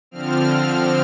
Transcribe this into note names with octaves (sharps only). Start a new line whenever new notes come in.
D3 F3 C4 F6